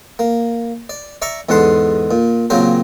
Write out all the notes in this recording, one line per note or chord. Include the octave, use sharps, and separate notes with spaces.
A#3
D5
D5 E5 A#5 C#6 D6
E2 G#2 D3 F#5 A5 C6
A#2
A#2 C#3 F#3 C4 G4 A#4